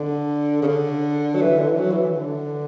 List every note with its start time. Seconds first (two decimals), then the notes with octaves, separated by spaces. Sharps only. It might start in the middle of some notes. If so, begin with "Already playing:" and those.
Already playing: D3
0.62 C#3
0.67 D3
1.35 F#3
1.41 E3
1.58 D3
1.68 E3
1.78 F#3
1.92 E3
2.03 E3
2.16 D3